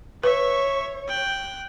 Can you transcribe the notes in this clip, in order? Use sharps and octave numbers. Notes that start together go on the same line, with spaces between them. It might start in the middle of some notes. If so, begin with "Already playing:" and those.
B4 C#5 E5 C#6
G5 F#6